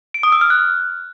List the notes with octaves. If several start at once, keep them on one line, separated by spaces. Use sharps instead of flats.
D7
D#6
E6
F6
F#6